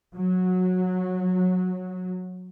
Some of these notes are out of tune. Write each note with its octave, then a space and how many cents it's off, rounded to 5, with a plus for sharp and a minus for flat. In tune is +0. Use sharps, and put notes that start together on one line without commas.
F#3 -15